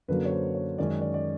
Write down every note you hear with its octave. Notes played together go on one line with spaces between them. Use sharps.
F#2 D3 F#3 A#3 B4
C#5
C5
C#5
F#2 D#3 G#3 C#4 D5
D5
D5